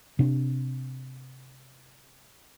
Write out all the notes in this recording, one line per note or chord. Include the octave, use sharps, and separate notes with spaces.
C3 D4